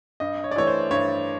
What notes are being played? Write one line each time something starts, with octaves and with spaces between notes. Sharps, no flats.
G2 D#5
C#5
D5
E3 A3 C#5
C5
G2 C#5